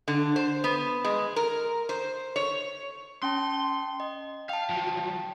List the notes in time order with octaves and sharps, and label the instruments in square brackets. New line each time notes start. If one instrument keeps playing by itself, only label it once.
[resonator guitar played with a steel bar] D3
C5
B3
G#3
A#4
C5
C#5
[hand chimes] C#4 G5 A5 [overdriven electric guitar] C6
[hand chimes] D#5
[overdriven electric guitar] F5 [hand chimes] G5 A5
[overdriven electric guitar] F3 F#3